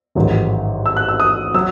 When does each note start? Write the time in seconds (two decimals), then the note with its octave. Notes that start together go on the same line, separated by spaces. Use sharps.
0.15 A1 G#2 D#3 F#3
0.86 E6
0.97 F#6
1.08 E6
1.20 D#6
1.54 F#3 E6